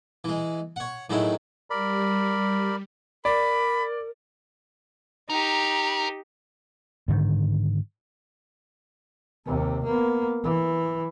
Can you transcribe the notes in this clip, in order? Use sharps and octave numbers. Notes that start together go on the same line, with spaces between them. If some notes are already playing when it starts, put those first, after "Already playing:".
E3 G#3
C#5 F#5
A2 D#3 F#3 G#3 E4
G3 A#4 D5 B5
A#4 D5 B5
D#4 G4 A#4
G#2 D3 D#3
D#2 C3
A#3 B3
E3